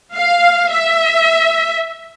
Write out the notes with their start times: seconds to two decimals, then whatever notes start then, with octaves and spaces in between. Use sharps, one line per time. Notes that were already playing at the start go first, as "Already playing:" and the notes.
0.14 F5
0.72 E5